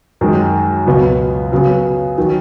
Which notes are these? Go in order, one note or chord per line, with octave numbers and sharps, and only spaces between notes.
F#2 D#3 G#3
C#2 B2 F#3 B3
C#3 F#3 B3
D#3 F#3